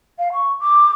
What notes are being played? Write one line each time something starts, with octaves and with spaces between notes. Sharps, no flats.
F5
C#6
D6